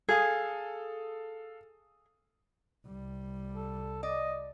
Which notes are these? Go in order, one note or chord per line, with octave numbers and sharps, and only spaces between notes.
G#4 A4 F5 D#6
C2 G3
A4
D5 D#5